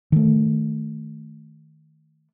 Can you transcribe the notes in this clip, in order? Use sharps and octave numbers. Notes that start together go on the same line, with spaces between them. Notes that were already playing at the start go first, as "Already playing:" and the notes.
D#3 A3